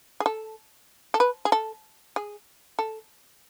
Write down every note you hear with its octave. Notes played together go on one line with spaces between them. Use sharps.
G#4
A4
A4
B4
G#4
A4
G#4
A4